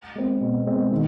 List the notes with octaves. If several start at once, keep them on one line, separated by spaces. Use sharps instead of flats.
G#3 C4
B2
G#3 C4
D#3